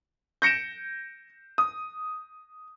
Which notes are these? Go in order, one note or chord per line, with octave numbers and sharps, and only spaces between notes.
G6 A#6 C#7 D7 E7
D#6